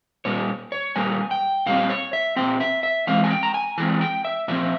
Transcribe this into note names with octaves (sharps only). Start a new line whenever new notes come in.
A#2 G3 C#5
C#5
A#2 G3 A#3 G#5
G5
A#2 G3 C4 F5
C#5
E5
A#2 G3 C4 G5
E5
E5
E3 G#3 C4 F5
G#5
G5
A#5
G#5
E3 G#3 C4 G#5
G5
E5
A#2 F3 C4 E5